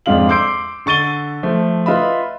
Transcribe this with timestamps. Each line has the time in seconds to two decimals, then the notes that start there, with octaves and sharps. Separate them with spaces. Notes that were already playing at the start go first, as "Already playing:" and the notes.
0.06 F2 G#2 D4 F4 F5 F#7
0.29 C6 D6 E6 G6 C7 D7
0.86 D3 C#6 A6 D#7 G7
1.43 F3 A3
1.86 F4 B4 D#5 E5 B5